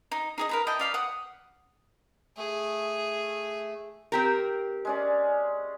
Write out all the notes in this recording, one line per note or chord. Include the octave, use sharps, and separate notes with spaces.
D#4
D#4 G#4 D#5
A#4 B4 A#5
E4 D#5 G5 A5
D5 F5 B5
F#5 D#6
A3 G#4
C4 G4 A#4
G#3 C#4 D5